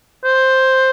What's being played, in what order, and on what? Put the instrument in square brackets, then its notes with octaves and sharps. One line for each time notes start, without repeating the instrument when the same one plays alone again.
[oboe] C5